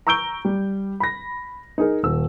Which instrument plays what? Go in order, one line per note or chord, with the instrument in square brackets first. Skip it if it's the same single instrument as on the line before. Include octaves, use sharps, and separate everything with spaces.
[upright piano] A#5 C#6 E6 G6 D7 G7
G3
B5 A#6
D#4 G#4 A#4
D#1 E6